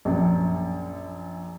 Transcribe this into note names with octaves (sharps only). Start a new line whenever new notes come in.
A#1 F#2